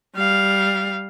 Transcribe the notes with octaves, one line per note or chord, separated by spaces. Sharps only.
G3 F5